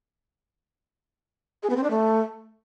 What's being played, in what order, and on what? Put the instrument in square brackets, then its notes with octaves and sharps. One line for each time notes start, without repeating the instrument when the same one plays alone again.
[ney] G#4
B3
C4
D4
A3